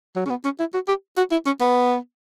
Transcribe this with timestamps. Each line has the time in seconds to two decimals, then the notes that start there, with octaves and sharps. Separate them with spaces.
0.16 F#3
0.26 C#4
0.30 B3
0.45 C#4
0.59 E4
0.74 F#4
0.88 G4
1.17 F#4
1.32 E4
1.46 C#4
1.60 B3